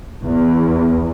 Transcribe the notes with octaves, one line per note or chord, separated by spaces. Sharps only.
E2